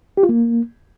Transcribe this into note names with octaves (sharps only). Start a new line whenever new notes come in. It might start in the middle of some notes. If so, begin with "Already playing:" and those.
G4
F4
A#3